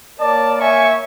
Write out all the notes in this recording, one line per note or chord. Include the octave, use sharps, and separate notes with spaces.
A#3 A#4 C#5 D5 A5
E5 G#5 C#6